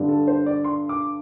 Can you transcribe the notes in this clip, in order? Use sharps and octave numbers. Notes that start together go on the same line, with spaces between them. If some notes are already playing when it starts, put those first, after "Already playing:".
Already playing: G2 D3 G3
A4
C5
D5
C6
D6